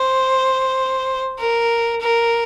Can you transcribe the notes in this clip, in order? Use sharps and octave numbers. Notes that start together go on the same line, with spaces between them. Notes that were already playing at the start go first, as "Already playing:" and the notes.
Already playing: C5
A#4
A#4